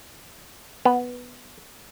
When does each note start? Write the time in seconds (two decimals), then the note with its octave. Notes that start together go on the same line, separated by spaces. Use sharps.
0.85 B3